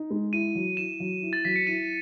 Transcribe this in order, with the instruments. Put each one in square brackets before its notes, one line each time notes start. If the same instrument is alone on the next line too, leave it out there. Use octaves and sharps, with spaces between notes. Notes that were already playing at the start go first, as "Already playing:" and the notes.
Already playing: [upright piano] D#4
G#3
[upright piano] E4 [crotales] D#7
[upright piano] F#3
[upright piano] E4 [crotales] E7
[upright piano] F#3
E4
[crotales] A6
[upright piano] F#3 [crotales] B6
[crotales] C#7
[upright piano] E4 [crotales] D#7